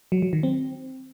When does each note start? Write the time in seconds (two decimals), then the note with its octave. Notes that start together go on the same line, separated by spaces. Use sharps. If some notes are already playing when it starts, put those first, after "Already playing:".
0.12 F#3
0.22 F#3
0.33 D#3
0.43 C4